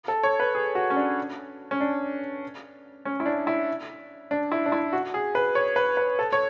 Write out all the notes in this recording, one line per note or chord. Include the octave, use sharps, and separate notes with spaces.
A4
C#5
B4
G#4
F#4
C#4
D4
C#4
D4
C#4
E4
D4
E4
D4
E4
D4
E4
F#4
G#4
B4
C#5
B4
B4
A4
C#5